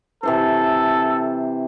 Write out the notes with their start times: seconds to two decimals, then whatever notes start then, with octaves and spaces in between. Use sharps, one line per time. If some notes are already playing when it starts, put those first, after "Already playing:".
0.23 C3 E3 A4 C5